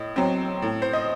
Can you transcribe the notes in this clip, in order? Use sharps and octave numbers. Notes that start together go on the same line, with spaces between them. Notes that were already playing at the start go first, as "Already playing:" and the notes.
Already playing: A2 D#5
F#3 C4
A2
C5
D#5